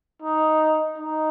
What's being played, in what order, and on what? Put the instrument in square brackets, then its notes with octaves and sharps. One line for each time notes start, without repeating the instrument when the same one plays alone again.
[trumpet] D#4
D#4